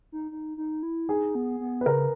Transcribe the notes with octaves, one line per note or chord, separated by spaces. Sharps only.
D#4
D#4
D#4
E4
D#4 G#4
B3
B3
B4
C#3 A#4